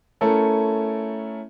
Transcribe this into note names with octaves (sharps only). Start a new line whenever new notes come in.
A3 C#4 E4 A4 A#4